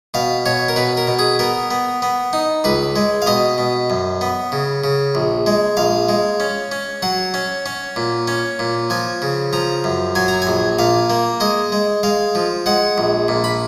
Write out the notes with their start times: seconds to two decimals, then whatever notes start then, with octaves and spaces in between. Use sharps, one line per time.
0.14 B2 F5
0.46 B2 C#5
0.69 A#4
0.76 B2 B4
0.97 A#4
1.07 B2
1.19 G#4
1.39 B3 A#4
1.71 B3
2.02 B3
2.33 D#4
2.64 C#2 B4
2.96 G#3
3.22 F5
3.27 B2 D#5
3.58 B2
3.90 F#2
4.21 B3
4.52 C#3
4.84 C#3
5.15 A#1
5.46 G#3
5.77 A#1 F5
6.09 G#3
6.40 C#4
6.72 C#4
7.02 F#3 F#5
7.34 C#4
7.66 C#4
7.96 A#2
8.28 C#4
8.59 A#2
8.90 F3 G#5
9.22 C#3
9.53 F3 A#5
9.84 F#2
10.15 F#3 G#5
10.28 A#5
10.42 G#5
10.47 A#1
10.79 A#2 F5
11.10 A#3
11.40 G#3 D#5
11.72 G#3
12.03 G#3 F5
12.35 F3
12.66 G#3 F#5
12.98 A#1
13.28 A#2
13.44 B5